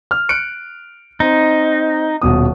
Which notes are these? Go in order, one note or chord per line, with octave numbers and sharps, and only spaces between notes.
F6
F#6 C#7 D7
C4 D#4
D#1 B2 D#6